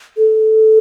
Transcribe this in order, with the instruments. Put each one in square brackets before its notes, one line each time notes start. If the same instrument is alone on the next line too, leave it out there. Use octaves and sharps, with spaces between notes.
[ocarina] A4